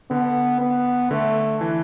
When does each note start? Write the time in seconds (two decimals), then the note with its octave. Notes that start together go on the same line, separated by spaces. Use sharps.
0.10 D3 B3
0.61 B3
1.11 D3 A3
1.61 E3